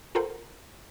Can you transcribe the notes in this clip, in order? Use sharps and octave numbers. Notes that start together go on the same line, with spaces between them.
F4 A4 A#4 C5 F#5 G5